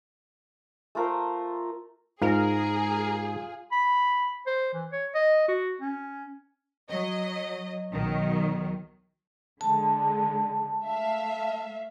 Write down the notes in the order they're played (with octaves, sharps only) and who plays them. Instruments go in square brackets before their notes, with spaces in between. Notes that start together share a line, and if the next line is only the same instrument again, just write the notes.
[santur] A3 F4 A#4 C5
[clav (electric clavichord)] G#2 [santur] F4 A#5 [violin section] G#4 [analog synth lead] A#4
[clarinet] B5
C5
E3
C#5
D#5
F#4
C#4
[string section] F#3 D#5
B1 D#3 F#3
[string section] D3 G#3 [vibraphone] A5
[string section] A3 E5 F5